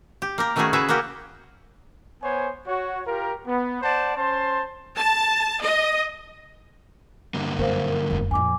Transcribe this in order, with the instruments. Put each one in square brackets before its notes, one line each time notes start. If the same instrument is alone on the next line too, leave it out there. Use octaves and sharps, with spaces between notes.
[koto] G4
A#3 G4 A#4
D#3 A3 C#4 E4 F#4 G#4
C#3 E4 F#4 G#4 B4 E5
A#3 C#4 F#4 G4
[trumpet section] B3 C5 C#5 G#5
F#4 C#5
F4 G4 A#4
B3
C5 D5 F#5 A5
C#4 C5 A5 C6
[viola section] A5
D#5
[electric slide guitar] G2 D3 A#3
[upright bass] F#2 B2 [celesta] A#4 C5 F5
[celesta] A#4
[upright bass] F1 F#2
[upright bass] F2 A#2 [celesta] G#5 D6